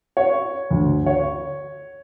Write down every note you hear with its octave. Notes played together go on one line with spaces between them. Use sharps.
C#5
D2
C#5